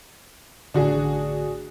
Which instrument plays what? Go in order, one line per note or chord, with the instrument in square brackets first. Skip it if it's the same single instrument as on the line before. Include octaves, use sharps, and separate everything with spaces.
[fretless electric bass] A1 D3 [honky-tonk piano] D4 F#4 G#4